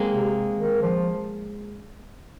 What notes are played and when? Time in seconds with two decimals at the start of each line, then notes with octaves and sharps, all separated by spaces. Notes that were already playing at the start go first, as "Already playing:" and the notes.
Already playing: G#3 A#3 C4
0.11 C3
0.58 D#3
0.82 F3